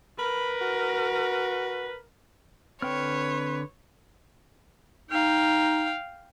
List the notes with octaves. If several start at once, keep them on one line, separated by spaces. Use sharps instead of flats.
A#4 B4 B5
F#4
D3 C4 B4 C#5 G5 F6
D#4 F5 G5